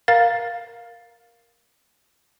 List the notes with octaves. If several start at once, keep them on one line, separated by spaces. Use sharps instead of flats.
A#4 F5 A6